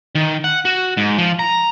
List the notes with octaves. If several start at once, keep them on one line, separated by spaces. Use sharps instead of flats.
D#3
F#5
F#4
G#2
F3
A#5